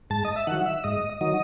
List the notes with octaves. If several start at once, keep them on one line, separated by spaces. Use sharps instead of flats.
G#2 A5
D#5
E5
D#3 F#3 F#5
E5
G#2 D#5
D#3 F#3 D#5